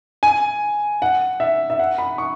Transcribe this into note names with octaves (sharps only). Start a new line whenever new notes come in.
G#5
F#5
E5
E5
F#5
B5
C#6